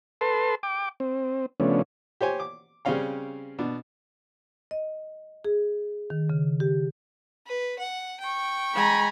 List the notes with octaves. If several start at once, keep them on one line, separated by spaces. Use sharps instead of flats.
A4 B4 A5 C6
G5 D6
C4
C#3 F3 A3 B3 C#4 D4
G4 C5 C#5 G#5
D6
C#3 G3 C4 C#4 F5 G5
B2 D4
D#5
G#4
D#3
C#3
G4
B4
F#5
G5 C#6
G#3 G#5 A#5 B5